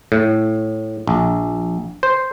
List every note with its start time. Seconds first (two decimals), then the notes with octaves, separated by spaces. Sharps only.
0.12 A2
1.07 A#1
2.03 C5